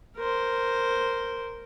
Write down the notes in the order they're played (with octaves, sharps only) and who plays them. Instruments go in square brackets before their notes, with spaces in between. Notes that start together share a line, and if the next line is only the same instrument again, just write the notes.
[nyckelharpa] A#4 C5